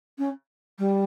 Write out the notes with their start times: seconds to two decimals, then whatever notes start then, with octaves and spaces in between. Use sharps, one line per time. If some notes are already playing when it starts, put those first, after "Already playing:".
0.18 C#4
0.79 G3